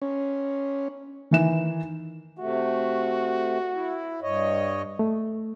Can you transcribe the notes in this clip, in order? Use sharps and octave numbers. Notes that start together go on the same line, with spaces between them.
C#4
D#3 E3 E7
C3 A3 F#4
E4
G2 C#5 D#5
A3